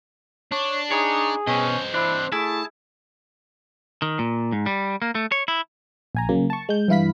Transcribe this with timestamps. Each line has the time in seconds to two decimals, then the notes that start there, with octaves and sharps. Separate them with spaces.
0.52 D4 C#5
0.92 D#4 G#4 C#5
1.47 B2 C4 C#4 D#5
1.94 D4 E4 C5
2.32 A3 E4 G#4 A5
4.02 D#3
4.19 A#2
4.52 G#2
4.66 G3
5.02 A#3
5.15 A3
5.32 C#5
5.48 E4
6.15 A#1 G#5 A#5
6.29 C#3 F#3 A#3
6.50 A5 C#6
6.69 G#3 G6
6.88 G2 E3 E4 F5 B5 B6